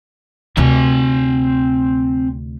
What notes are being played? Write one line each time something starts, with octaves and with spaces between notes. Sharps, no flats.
D2 C3 C4 G#5